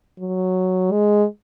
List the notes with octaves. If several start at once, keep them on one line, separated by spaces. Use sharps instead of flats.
F#3
G#3